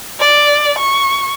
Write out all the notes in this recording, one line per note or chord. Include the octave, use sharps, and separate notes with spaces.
D5
C#6